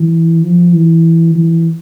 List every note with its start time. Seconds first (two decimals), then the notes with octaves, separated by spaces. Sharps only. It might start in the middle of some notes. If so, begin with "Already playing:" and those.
Already playing: E3
0.43 F3
0.73 E3
1.35 E3